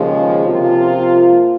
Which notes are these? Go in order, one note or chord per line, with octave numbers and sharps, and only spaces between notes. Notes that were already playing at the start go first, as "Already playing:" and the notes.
Already playing: D#2 C#3 F3 G#3
C3 F3 A#3 F4